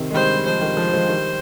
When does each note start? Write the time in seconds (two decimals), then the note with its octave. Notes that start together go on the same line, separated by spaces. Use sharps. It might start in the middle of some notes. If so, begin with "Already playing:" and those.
Already playing: C3 D#3
0.11 G#3
0.14 D#3 G3 C5
0.36 G3
0.46 F3 G#3 C5
0.61 D#3 G3
0.77 F3 G#3
0.93 F3 G#3
1.09 D#3 G3